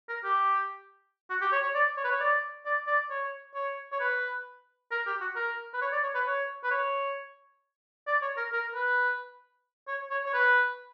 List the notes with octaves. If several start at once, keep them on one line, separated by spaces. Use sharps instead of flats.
A#4
G4
F#4
G4
C#5
C#5
D5
C#5
B4
C#5
D5
D5
D5
C#5
C#5
C#5
B4
A#4
G4
F#4
A#4
B4
C#5
D5
C#5
B4
C#5
B4
C#5
D5
C#5
A#4
A#4
B4
C#5
C#5
C#5
B4